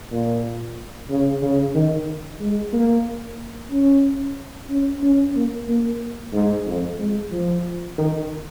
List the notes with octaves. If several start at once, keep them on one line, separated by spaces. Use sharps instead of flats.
A#2
C#3
C#3
D#3
G#3
A#3
C#4
C#4
C#4
A#3
A#3
G#2
F2
G#3
F3
D#3